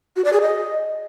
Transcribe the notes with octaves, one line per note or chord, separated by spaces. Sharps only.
F#4
D5
G#4
D#5